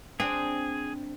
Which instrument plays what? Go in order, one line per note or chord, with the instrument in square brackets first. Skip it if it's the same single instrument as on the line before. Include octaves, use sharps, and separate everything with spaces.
[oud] C4 D4 [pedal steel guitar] G#4